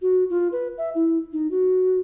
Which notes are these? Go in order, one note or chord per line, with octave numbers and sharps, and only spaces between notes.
F#4
F4
B4
E5
E4
D#4
F#4